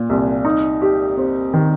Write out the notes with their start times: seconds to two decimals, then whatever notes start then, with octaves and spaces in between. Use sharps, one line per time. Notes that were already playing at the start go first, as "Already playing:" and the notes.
Already playing: A#2
0.09 C2
0.45 D#4
0.82 G4
1.17 C4
1.54 D#3